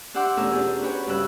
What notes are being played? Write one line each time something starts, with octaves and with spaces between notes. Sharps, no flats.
D4 G4 E5 F#5 C6 D6
E2 B2 A3 C#4 A#4 E5
C#4 D4 F4 G4 G#4
F#4 B4 C#5 G5
G2 C#3 C#4 E5 F#6